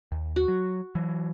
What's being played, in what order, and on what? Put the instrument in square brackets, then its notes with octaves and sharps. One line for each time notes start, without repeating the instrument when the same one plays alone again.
[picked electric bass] D#2
[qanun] F#4
[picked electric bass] F#3
E3 F#3